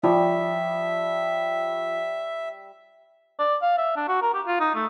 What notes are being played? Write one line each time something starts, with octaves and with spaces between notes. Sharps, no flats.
F3 G3 C#5 E5
D5
F5
E5
D4
F#4
A#4
G4
F4
D#4
A3